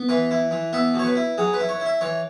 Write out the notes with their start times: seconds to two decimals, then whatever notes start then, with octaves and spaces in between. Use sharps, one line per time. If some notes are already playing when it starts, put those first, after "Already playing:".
Already playing: B3
0.09 E3 B4
0.31 E4
0.51 E3
0.73 B3 E5
0.94 B2
0.99 C#5
1.05 B4
1.15 E4
1.38 F#3 G#4
1.53 B4
1.59 E4
1.69 C#5
1.80 E4
1.85 E5
2.01 E3 C#5